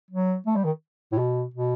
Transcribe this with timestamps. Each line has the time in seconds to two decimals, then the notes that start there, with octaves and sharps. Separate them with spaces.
0.11 F#3
0.46 A3
0.56 G3
0.64 D#3
1.12 A2
1.18 B2
1.54 B2